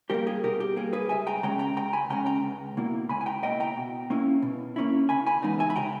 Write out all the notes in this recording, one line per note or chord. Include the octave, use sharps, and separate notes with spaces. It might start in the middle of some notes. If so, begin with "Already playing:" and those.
G3 A#3 G4 A#4
G#4
B2 G4 A#4
G4
G3 A#3 G#4
G#4 B4
C#2 E5 G#5
G5 A#5
C#3 G#3 C#4 G5 A#5
G5 A#5
C#2 G5 A#5
G#5 B5
C#3 G#3 C#4 G5 A#5
G5 A#5
C#2
B2 A#3 E4
C#2 G#5 B5
G#5
G5 A#5
B2 A#3 E4 D#5 G5
G5 A#5
B2
A#3 C#4 E4
B2
A#3 C#4 E4
C#3 G#5 B5
G#5 B5
E3 G#3 B3 D#4
E5 G#5
B5
C#3 G5 A#5